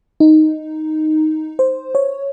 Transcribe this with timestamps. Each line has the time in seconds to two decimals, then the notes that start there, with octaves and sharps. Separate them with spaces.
0.20 D#4
1.59 C5
1.95 C#5